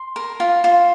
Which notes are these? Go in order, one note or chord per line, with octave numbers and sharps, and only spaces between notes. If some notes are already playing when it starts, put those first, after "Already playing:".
Already playing: C6
A#4
F4
F4